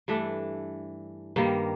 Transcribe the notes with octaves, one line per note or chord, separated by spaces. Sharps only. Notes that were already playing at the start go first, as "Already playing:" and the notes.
G2 E3 A3 D4
G2 D#3 G3 A#3